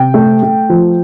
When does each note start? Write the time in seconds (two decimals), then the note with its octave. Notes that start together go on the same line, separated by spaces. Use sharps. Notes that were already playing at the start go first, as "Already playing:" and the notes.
Already playing: C3 G5
0.14 A3
0.42 A3
0.69 F3